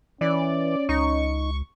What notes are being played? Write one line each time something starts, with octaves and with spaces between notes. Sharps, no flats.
E3 C#4 D5
C#2 D#4 C#6